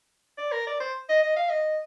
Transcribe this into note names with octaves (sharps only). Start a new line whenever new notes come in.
D5
A#4
D5
C5
D#5
D#5
F5
D#5